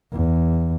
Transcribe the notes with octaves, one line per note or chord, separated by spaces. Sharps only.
E2